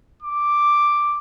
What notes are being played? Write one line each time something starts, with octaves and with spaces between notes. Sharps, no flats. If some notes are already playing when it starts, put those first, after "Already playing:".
D6